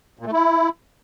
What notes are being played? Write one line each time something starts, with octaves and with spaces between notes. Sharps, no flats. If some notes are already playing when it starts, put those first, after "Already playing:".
A#2
A3
E4